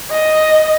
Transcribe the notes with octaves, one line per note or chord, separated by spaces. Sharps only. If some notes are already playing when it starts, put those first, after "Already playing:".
D#5